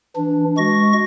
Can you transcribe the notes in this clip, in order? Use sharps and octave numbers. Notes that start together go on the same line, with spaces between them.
E3 D4
G#3 F#4 C#6 A#6